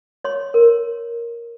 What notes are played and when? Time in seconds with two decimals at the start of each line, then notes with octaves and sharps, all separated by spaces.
0.24 C#5 C6
0.54 A#4